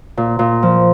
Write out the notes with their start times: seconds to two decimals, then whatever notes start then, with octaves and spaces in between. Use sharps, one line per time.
0.17 A#2
0.39 A#2
0.63 F3